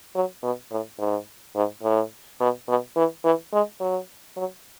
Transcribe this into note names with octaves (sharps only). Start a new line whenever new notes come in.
F#3
B2
A2
G#2
G#2
A2
B2
B2
E3
E3
G#3
F#3
F#3